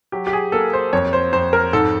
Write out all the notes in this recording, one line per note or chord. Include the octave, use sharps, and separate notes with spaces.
F#3 G4
G4
G#4
A#3 A4
C5
F2 C#5
C5
F2 C5
A#4
G#2 A4